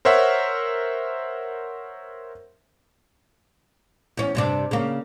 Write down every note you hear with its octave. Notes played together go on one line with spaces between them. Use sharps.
A#4 C5 C#5 E5 F#5
E2 C#4
G2 C3 D4
C#3 A#3